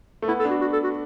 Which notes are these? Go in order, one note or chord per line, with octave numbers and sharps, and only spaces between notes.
A3
B3 E4
A4
D4
F#4
F#4
A4
F#4